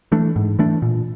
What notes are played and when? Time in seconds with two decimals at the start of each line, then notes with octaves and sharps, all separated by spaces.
0.12 E3 A3 D4
0.36 G#2
0.59 E3 A3 D4
0.82 A#2